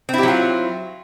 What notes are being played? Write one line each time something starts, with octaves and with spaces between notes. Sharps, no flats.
F#3 C4 E4 F4 G4